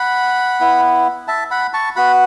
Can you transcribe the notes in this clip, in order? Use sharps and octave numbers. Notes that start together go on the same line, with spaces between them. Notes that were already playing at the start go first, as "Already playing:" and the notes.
Already playing: F#5 B5
B3 E4
E5 A5
F#5 B5
A5 C#6
B3 F#4 F#5 B5